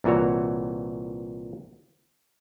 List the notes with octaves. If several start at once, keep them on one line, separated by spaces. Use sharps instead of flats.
C2 A#2 E3 F#4 C#5